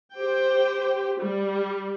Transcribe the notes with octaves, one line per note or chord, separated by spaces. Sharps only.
G4 C5 G5
G3